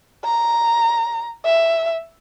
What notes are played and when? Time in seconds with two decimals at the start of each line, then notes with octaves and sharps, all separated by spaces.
0.25 A#5
1.46 E5